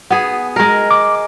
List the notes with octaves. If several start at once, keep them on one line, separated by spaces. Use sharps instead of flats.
B3 G#4
G#3 A#4
D6